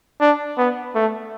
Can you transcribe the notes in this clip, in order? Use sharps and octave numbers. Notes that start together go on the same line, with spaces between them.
D4
B3
A3